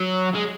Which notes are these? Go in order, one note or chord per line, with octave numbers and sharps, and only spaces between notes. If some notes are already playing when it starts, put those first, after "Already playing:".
Already playing: F#3
G#3